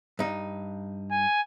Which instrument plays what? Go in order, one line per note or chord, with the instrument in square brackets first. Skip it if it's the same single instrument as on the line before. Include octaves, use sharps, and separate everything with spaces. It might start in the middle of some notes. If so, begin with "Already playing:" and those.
[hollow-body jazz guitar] G2 D#4
[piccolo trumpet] G#5